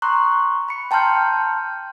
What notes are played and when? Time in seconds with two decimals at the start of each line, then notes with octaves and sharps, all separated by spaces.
0.02 A#5 C6 C#6 D#6 F#6
0.68 B5 C#7
0.91 G5 A5 A#5 C6 F6 G6